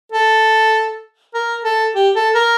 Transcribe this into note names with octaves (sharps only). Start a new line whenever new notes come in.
A4
A#4
A4
G4
A4
A#4